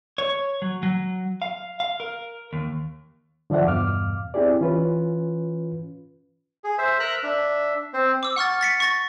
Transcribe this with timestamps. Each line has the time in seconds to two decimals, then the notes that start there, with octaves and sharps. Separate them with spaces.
0.18 C#5
0.62 F#3
0.83 F#3
1.42 F5
1.80 F5
2.00 A#4
2.53 D#2
3.50 D3 F3 D5 E5 F#5
3.64 E2 G2 B2 F5 D6 F6
4.34 C4 E4 G4 G#4 D5
4.61 E3 C#4 F4 B4
6.64 G#4
6.78 C5 E5
7.00 A#4 E5 A#5 E6 F#6
7.23 D4 E5
7.94 C4 C5
8.23 D6 E6
8.36 F#5 C#6 F6 A6
8.61 A6 B6 C#7
8.80 C#6 A6 A#6